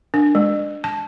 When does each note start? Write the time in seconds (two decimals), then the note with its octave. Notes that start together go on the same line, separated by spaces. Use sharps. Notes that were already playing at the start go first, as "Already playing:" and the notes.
0.14 D4
0.35 G#3
0.84 A5